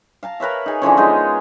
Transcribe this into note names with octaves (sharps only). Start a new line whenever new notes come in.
F5 A5 A#5
A#4 B4 C#5 E5
D#4 G#4
D3 E3 F3 C#4
G#3 B3 D#4 F4